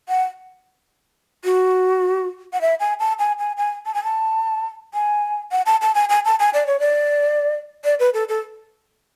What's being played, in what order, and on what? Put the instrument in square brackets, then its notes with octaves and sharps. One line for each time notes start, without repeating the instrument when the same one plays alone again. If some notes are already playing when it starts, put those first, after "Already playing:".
[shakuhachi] F#5
F#4
F#5
E5
G#5
A5
G#5
G#5
G#5
A5
G#5
A5
G#5
F#5
A5
A5
G#5
G#5
A5
G#5
D5
C#5
D5
D5
B4
A4
A4